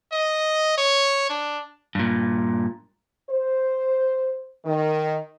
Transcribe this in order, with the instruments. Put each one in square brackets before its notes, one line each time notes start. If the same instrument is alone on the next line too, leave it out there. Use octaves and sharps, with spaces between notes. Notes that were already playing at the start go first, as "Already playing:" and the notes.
[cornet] D#5
C#5
D4
[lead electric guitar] G2 A#2
[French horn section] C5
D#3